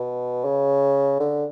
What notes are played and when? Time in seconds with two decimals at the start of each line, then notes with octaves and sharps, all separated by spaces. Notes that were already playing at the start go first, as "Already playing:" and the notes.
Already playing: B2
0.45 C#3
1.19 D3